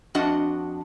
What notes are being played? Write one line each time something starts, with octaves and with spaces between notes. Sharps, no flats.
F2 D4 F#4 D#5 F#5